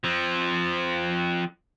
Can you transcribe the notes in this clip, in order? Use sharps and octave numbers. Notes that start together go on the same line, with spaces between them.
F3 C4